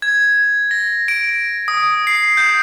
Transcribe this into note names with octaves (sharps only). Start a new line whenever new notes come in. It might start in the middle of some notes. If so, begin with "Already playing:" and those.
G#6
A#6
D7
D#6
C7
G6